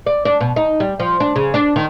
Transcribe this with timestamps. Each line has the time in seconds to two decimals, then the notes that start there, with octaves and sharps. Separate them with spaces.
0.06 D5
0.25 D4
0.40 B2
0.56 D#4
0.80 G3
1.00 F3
1.20 D4
1.36 C#3
1.54 D4
1.76 D#3